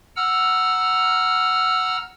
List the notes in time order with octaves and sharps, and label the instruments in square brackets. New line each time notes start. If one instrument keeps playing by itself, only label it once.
[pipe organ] F#5 A#5 E6 F6